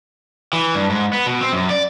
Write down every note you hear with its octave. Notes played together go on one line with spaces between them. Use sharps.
E3
G2
G#2
B3
B2
C4
F#2
D5